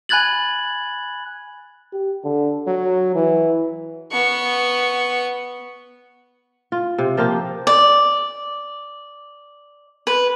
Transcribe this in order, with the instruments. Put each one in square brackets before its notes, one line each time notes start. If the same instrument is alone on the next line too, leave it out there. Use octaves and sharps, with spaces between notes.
[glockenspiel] G#5 B5 F#6 G#6 A6 F#7
[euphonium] G4
D3
F#3
E3
[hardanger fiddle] B3 C#6
[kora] F4
C3
F3 A#3 F4 G4
[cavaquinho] D5
B4